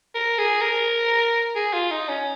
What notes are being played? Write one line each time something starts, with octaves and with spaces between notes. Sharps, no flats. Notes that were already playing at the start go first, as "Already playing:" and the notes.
A#4
G#4
A#4
G#4
F4
D#4
C#4